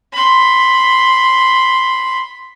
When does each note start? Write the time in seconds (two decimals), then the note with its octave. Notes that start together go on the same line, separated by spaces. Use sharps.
0.13 B5 C6